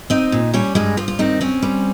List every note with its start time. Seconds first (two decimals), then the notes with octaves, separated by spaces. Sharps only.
0.10 C4 D#4 D#5
0.32 A#2
0.54 G3 C#4 C#5
0.75 G2 G#3 G#4
0.97 G2 F3 F4
1.08 F4
1.19 D#3 C4 D#4
1.41 C4 C#4
1.62 G3